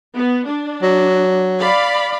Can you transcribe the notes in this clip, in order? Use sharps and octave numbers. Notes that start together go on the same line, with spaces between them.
B3
D4
F#3
D5 F5 B5